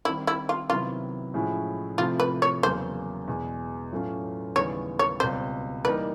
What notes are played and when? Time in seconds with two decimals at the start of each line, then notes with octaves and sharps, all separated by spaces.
0.05 D#3 G3 C4 E4
0.27 E4
0.49 F4
0.70 C3 D#3 F#3 B3 E4 F4
1.34 A2 F3 G#3 C#4 E4
1.98 C3 F3 A3 C4 E4 F4
2.20 B4
2.42 C#5
2.63 E2 C#3 F#3 A#3 C5
3.28 E2 B2 G#3
3.92 A2 F#3 A3 C#4 F4
4.56 D#2 C#3 E3 G3 B3 C#5
4.99 C#5
5.20 C#2 B2 G3 C4 C5
5.85 E3 G3 A#3 D#4 B4